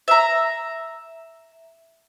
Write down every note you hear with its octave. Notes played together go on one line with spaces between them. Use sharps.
E5 A#5